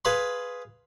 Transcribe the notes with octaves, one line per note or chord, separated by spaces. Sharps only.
G#4 B4 F5 B5 C6